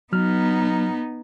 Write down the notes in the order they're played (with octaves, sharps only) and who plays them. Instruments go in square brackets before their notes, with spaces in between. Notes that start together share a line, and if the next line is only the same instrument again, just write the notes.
[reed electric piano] F#3 F6 [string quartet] B3 D#4